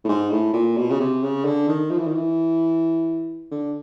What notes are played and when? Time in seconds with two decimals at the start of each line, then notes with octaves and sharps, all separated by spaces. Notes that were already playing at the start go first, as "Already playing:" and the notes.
0.04 A2
0.09 G#2
0.30 A2
0.53 A#2
0.77 B2
0.90 C#3
1.00 C3
1.23 C#3
1.45 D3
1.68 D#3
1.91 F3
1.98 E3
2.07 D#3
2.14 E3
3.51 D3